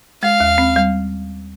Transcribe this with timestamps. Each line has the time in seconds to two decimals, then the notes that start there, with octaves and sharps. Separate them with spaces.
0.22 G#3 F5
0.40 D#2
0.58 C4
0.76 G3